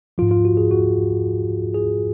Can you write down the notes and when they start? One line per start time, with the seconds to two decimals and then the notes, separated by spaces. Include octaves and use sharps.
0.18 G#2 F3 F4
0.31 F4
0.45 F#4
0.57 G#4
0.71 F#4
1.74 G#4